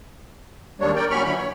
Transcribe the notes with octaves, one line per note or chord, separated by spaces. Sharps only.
D#2 G3 G#3 A#3 D4 C#5
A#4 D5 G5
A#2 F#3 C#4 B5 C#6 F6
D3 E3 F#3 B5
C#5